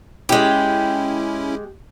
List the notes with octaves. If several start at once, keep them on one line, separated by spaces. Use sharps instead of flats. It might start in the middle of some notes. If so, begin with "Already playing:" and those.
G#3 C#4 E4 G4